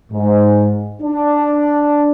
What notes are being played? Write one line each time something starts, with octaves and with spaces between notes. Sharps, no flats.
G#2
D4